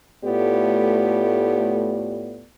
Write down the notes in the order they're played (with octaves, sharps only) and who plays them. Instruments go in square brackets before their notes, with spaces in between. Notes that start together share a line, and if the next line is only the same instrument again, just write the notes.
[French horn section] A2 A3 B3 F4 G4 D5